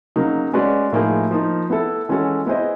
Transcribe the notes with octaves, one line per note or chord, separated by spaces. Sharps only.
C#3 F#3 A#3 D#4
G#3 C#4 F#4 B4 D5
A2 F3 A#3 D#4 G#4
F3 A#3 D#4
B3 E4 A4
E3 G#3 C#4 F#4 A4
B3 E4 G#4 C5 D#5